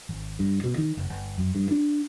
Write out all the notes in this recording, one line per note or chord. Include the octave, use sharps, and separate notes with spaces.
G#1
G2
B2
D#3
F#1
G1
F#2
G2
D4